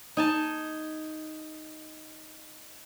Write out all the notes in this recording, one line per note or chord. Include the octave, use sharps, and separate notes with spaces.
D#4 G#5 A5